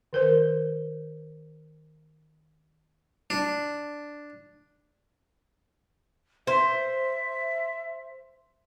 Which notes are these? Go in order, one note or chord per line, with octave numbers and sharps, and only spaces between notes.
D#3 A#4 C5
D4
C5 E5